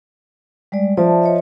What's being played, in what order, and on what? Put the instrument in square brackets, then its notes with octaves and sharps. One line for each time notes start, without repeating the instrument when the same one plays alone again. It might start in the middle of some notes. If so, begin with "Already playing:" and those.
[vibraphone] G3 G#3 D5
[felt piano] F3 [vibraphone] D5 E5 A5
[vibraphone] C#5 D#5 E5